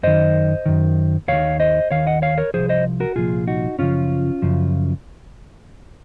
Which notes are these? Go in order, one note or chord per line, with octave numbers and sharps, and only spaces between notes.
F#2 D#3 C5 D#5
F#2 D#3
D#2 D#3 C#5 F5
C5 D#5
D#2 D#3 C#5 F5
D#5 F#5
C#5 F5
A#4 C#5
C2 A#2 F3 G#4 C5
C5 D#5
F#4 A#4
C2 A#2 F3 F4 G#4
D#4 F#4
F#2 C#3 F3 C#4 F4
F#2 C#3 F3